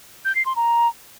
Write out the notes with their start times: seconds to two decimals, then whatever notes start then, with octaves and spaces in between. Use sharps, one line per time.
0.25 G6
0.35 C7
0.46 C6
0.56 A#5